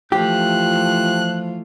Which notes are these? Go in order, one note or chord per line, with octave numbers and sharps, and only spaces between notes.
E3 F3 A3 F4 G4 F#6